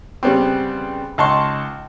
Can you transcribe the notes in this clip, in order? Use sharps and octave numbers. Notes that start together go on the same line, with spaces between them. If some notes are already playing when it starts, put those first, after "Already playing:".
C#3 G3 B3 C4
C#2 D#4 A5 C6 C#6